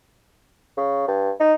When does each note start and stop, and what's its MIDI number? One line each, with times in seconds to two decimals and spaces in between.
0.77 1.05 49
1.08 1.31 43
1.40 1.54 63